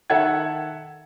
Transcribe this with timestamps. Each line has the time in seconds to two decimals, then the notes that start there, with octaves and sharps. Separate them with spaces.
0.10 D#3 A4 E5 F#5 G#6